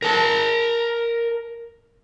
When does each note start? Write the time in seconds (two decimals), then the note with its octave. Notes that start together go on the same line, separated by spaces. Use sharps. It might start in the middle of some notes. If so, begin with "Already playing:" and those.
0.02 A#4 A5